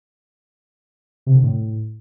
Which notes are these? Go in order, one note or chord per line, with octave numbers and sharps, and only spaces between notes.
C3
D3
A2